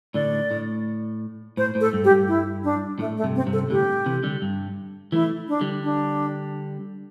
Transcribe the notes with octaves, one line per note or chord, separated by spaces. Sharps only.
A2 D3 D5
A2
A2 C5
A2
A4
G2
A2 G4
G2
E4
D4
A2 A3
A3
G2 C3
C4
G2 C3
A4
A2 D3 G4
C3 E3
D3 G3
G2
E3 A3 E4
D4
D3 G3
D4